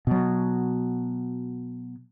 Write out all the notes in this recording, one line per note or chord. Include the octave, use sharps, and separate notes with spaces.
B2 F#3